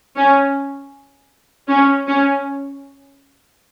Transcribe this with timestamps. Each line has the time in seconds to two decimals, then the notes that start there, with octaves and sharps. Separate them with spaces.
0.17 C#4
1.68 C#4
2.07 C#4